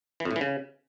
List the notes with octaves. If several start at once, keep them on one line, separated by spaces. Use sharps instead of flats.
E3
F2
A2
E3
C#3